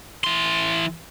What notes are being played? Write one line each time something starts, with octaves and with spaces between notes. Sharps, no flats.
E3 C6